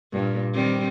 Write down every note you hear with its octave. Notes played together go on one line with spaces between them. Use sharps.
G2 A#2
D#3 G3 C4